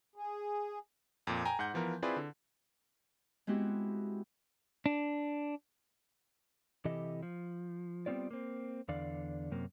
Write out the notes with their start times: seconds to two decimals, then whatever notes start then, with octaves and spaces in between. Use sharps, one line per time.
0.16 G#4
1.27 F2 A#2
1.45 G5 G#5 A#5
1.59 G#2 F#5 G6
1.74 E3 F3 B3 A#4
2.02 C4 E4 F4 G#4 B4 D5
2.16 D3
3.47 G#3 B3 C4 E4 F#4 G4
4.86 D4
6.85 C3 E3 E4 G4 A4 D#5
7.23 F3
8.06 G3 B3 C4 F4 D5
8.31 A#3 C4
8.88 E2 D3 D5 F5
9.51 F#2 C3 A#3